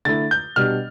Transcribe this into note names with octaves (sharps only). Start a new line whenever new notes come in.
D3 A3 E4 A6
G6
B2 G3 D4 F6